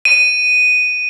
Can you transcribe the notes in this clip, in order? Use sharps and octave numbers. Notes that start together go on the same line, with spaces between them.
D#7